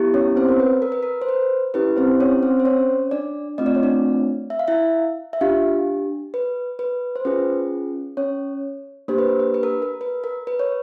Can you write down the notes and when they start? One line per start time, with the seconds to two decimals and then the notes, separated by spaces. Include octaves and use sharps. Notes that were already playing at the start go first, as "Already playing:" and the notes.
Already playing: B3 E4 G4
0.14 C#4 C#5
0.36 C4 C5
0.49 A#4
0.60 B4
0.82 A#4
0.92 B4
1.03 A#4
1.22 C5
1.29 B4
1.74 C#4 E4 G4 B4
1.97 C4 C5
2.20 C#4 C#5
2.42 C4 C5
2.60 C5
2.65 C#4 C#5
3.11 D4 D5
3.58 A3 C4 F4 D#5
3.66 D5
3.75 C#5
3.83 D4 D5
4.50 E5
4.59 F5
4.68 E4 E5
5.33 E5
5.41 D4 F4 G4 F5
6.34 B4
6.79 B4
7.16 C5
7.25 C#4 F4 G#4 B4
8.17 C#4 C#5
9.08 A#3 D4 G4 C5
9.18 B4
9.28 A#4
9.40 B4
9.54 B4
9.63 A#4
9.82 A#4
10.01 B4
10.24 A#4
10.47 B4
10.59 C#5